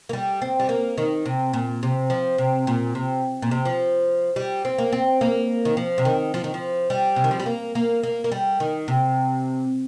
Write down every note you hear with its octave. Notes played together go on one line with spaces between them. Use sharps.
A#3
G3
C4
G3
A#3
D#3
C3
A#2
C3
F3
C3
A#2
C3
A#2
C3
F3
G3
C4
A#3
C4
A#3
D#3
F3
C3
D#3
F3
D#3
F3
G3
C3
D#3
F3
G3
A#3
A#3
A#3
A#3
G3
D#3
C3